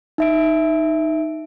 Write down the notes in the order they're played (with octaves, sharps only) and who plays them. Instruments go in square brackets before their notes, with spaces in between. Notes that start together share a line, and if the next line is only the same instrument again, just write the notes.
[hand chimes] D#4 E5 D7